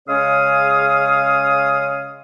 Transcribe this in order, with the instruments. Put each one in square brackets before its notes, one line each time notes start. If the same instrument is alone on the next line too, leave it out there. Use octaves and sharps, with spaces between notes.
[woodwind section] C#3 G#3 C#4 C#5 F5 D#6